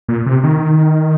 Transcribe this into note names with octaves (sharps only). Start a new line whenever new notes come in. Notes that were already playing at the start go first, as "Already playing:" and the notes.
A#2
C3
D#3